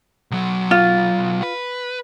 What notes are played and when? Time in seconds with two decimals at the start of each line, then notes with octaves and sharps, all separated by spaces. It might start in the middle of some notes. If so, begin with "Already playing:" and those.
0.31 B1 F#3
0.71 F4
1.43 B4